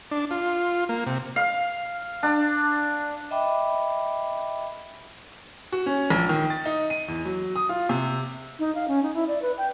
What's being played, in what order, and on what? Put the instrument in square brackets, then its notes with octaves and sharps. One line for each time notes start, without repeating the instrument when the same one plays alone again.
[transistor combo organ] D4
F4
A#3
C3
[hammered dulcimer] F5
D4
[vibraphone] D#5 E5 G5 B5 D6
[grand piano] F#4
C#4
A#1
D#3
A6
D#4
D#7
E2
F#3
D#6
F4
C3
[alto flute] D#4
F5
C#4
D#4
E4
D5
B4
G5